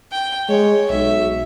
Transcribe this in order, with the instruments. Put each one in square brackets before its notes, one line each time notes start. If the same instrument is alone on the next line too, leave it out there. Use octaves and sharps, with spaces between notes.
[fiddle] G5
[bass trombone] G#3 [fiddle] C#5
[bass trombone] B1 [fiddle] E5